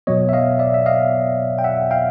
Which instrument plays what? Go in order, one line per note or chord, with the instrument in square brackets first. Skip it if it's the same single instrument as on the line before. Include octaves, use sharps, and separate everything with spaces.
[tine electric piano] B2 F#3 B3 C#5 D#5
E5
D#5 F5
D5 E5
E5
D#5 F5
G5
E5 F#5
F5 G5